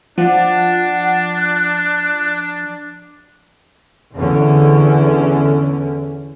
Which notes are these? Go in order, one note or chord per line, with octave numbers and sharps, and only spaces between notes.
F3 D4 F#5
F#6
E2 D3 C#4